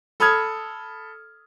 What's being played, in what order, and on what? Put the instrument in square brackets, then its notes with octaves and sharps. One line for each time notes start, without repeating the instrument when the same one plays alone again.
[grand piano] A4 B5 D#6 F6 G#6